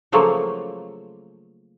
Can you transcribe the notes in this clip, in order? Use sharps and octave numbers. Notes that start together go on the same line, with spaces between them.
C#3 F3 F#3 A3 A#3